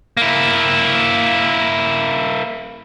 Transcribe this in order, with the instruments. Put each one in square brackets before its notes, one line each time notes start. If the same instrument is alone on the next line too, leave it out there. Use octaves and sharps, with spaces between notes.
[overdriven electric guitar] A#3 E4